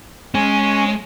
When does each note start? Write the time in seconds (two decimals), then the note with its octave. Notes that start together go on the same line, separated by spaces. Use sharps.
0.35 G#3 C#4